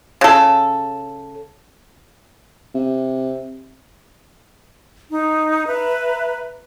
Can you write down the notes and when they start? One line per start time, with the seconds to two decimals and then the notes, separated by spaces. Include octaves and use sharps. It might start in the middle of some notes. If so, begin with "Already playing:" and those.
0.21 C#3 A4
2.75 C3
5.10 D#4
5.67 B4 E5 A#5